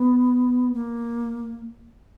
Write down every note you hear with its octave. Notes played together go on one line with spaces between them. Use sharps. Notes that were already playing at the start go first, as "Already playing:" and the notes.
Already playing: B3
A#3